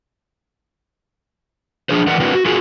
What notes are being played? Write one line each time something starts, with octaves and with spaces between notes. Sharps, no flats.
F3 D4 G#4 C5
E3 A#4 D5 F#5
C4 D4 E4 F#4 A#4 B4
F#4
F4 F#4 G#4 A#4